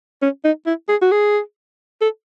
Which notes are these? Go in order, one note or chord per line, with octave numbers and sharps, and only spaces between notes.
C#4
D#4
E4
G#4
F#4
G#4
A4